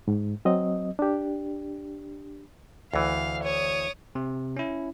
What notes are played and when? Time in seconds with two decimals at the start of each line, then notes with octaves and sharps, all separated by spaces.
0.08 G#2
0.45 F#3 C4 D#5
0.99 D4 G4
2.94 D2 E3 F5
3.44 C#5 D#6
4.15 C3
4.57 C#4 E4